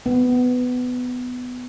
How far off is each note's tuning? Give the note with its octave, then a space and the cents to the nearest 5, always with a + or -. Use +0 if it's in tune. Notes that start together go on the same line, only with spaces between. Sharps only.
B3 +15